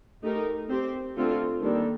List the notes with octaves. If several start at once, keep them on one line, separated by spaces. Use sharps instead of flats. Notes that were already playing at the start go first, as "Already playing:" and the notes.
A3 D#4 G4 A#4
C4 G4 C5
D3 A3 C4 F4 A4
D#3 G3 A#3 D4 A4